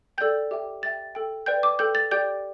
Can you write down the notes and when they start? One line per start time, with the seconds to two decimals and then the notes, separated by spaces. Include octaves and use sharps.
0.18 A4 D5 G5 G6
0.51 G4 E5 G5
0.82 G4 E5 G5 A6
1.15 A4 G5
1.46 B4 D5 G5 G6
1.63 D6
1.79 A4 G5 G6
1.95 A6
2.11 G4 D5 G5 G6